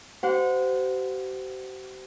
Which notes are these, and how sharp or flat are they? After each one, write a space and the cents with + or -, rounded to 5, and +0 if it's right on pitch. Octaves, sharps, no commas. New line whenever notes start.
G4 -45 C5 -25 F#5 -30